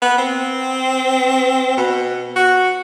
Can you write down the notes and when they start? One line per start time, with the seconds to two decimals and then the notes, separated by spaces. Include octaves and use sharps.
0.02 B3
0.18 C4
1.77 B2
2.36 F#4